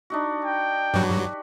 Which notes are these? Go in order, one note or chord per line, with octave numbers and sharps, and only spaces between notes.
D4 D#4 F#4
G5
G2 F#3 F#4 G4 B4